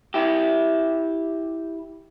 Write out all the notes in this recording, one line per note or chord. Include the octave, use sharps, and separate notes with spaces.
E4 G4